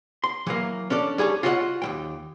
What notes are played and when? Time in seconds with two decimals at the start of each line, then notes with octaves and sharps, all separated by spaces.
0.24 C6
0.47 E3 F#3 A#3
0.90 C#4 D4 A4 D5
1.18 G3 G#4 A4 C#5
1.43 F4 F#4 C#5 D#5 E5 F#5
1.82 D#2 F3 G5